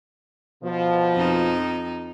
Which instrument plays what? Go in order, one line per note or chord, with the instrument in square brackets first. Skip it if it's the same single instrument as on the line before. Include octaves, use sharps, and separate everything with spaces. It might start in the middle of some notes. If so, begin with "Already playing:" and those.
[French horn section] B2 F3
[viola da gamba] F2 D#4